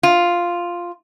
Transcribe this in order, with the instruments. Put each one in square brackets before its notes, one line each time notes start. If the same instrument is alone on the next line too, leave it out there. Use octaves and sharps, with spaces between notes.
[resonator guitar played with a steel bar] F4